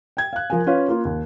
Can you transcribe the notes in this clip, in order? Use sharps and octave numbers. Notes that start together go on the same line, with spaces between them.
G5 G#6
F5 F#6
F3 A#4 F5 G#5
C#4 F4 B4 F5
A#3 F4
D#2